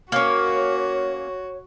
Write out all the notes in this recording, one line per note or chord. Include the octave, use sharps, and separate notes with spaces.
A#3 C#4 F#4 C#5